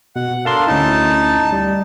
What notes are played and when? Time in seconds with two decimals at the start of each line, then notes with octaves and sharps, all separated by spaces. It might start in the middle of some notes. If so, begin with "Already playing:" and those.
0.16 B2 F#5
0.45 D4 A4 A#4 F5 A5 C6
0.67 D2 C#4 D#4 E4 A5
1.52 G3